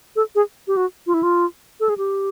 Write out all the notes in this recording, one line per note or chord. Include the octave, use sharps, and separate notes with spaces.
A4
G#4
G4
F#4
F4
E4
F4
A4
G#4
G4